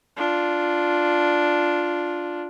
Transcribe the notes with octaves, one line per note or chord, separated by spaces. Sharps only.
D4 F4